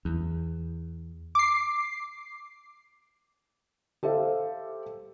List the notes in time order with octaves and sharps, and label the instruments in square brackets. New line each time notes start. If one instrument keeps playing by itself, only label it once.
[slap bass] E2
[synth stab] D6 C7
[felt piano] G4 A4 C5 E5 F5